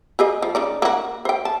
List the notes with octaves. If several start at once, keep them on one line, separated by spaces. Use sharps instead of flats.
G4 G#4 D#5
F3
C#3 D#4 D5
A#3 F#4
C5 G5
A5